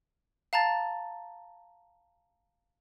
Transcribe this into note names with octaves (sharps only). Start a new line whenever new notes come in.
F5 A5 A#5 A6